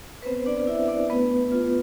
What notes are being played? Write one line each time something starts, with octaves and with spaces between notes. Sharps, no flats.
B4
B3 C4 C5
D4 D5
E4 E5
D4 D5
A3 B3 B4
D4 F4